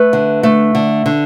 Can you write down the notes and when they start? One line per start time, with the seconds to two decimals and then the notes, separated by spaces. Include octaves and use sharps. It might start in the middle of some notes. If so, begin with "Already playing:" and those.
Already playing: A3 B4
0.13 D3
0.43 A3
0.75 D3
1.06 D3